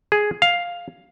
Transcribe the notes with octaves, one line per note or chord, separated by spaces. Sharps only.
G#4
F5